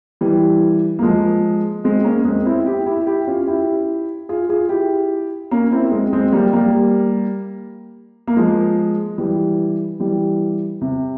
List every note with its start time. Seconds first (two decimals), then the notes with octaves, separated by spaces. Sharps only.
0.21 E3 G3
0.99 A#3
1.03 F3 G#3
1.84 G#3 C4
2.04 A#3 C#4
2.25 G#3 C4
2.45 C4 E4
2.66 E4 G4
2.86 E4 G4
3.07 E4 G4
3.27 C#4 F4
3.47 E4 G4
4.29 F4 G#4
4.50 F4 G#4
4.69 E4 G4
5.51 A#3 C#4
5.72 C4 E4
5.91 G#3 C4
6.13 G#3 C4
6.33 G3 A#3
6.53 G3 A#3
8.27 A#3
8.37 F3 G#3
9.18 E3 G3
10.00 E3 G3
10.81 C3